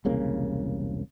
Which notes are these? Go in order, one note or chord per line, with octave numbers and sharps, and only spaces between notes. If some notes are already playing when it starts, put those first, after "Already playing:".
E1 C2 C#3 A#3